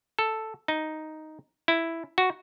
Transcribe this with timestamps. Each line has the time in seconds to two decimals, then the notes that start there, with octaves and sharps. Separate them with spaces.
0.19 A4
0.68 D#4
1.68 E4
2.18 F#4